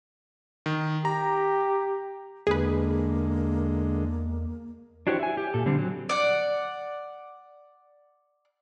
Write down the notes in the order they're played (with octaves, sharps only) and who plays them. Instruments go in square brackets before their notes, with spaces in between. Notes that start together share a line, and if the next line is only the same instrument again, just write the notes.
[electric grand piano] D#3
[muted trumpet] G4 [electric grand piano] A#5
[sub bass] E2 [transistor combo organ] D3 G#3 [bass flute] A#3 [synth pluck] G#4 B4
[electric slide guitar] D4 E4 F#4 G4 C5 C#5
E5 G#5
G4
A#2 A4
D3 G3 C4
F#3
[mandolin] D5 F#5